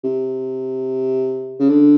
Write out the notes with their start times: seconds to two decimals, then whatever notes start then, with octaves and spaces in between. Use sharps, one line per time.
0.04 C3
1.60 C#3
1.69 D3